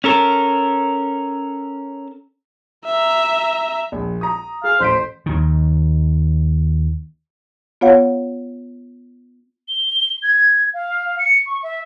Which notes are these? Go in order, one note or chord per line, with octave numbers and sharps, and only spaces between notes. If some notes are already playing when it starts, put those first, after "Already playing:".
C#4 A4 A#4
E5 A#5
A#1
A#5 D#6
G#4 F5
A1 C5 B6 D7
D#2 D#3
B3 F4 C#5 F5 F#5
G7
G#6
F5
C#7
C#6
E5